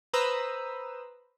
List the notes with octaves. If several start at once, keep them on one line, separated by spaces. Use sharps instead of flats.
B4 C5 A#5 B5 D#6 E6